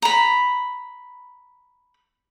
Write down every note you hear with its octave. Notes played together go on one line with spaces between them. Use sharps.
A#5 B5